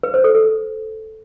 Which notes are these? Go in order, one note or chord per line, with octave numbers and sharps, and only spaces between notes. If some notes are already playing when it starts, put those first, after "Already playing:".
B4
C5
A4
A4